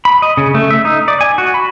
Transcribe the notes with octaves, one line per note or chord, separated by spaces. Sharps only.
B5
D#5
C#3
A3
E5
D#4
D5
G#5
F#4
B5